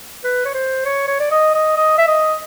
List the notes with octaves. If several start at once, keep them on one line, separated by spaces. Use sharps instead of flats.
B4
C#5
C5
C#5
C#5
D5
D#5
D#5
D#5
E5
D#5